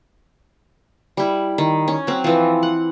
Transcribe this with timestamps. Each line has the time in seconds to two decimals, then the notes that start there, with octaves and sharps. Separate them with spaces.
1.17 G3 E4
1.58 D#3
1.88 C#4
2.07 F#3 C4
2.24 E3 F3
2.63 F#5